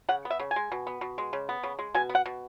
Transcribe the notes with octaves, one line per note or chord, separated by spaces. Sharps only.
C#3 F#5
B3
E5
C#3
G#5
G#3
B2
B3
B2
G#3
C#3
B3
C#3
G#3
B2 G#5
B3
F#5
B2